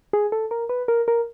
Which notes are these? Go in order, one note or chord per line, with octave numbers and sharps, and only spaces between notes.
G#4
A4
A#4
B4
A#4
A#4